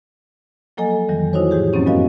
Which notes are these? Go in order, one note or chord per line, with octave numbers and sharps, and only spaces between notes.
F3 F#3 A#3 A4 D#5 G#5
F2 D#3 E3 G3
D#4 E4 F#4 C5 C#5
A2 F3 G4 G#4
F#2 F#3 A#3 C4 C#4 D#4
G#3 B3 F#4 A#4 D#5 F5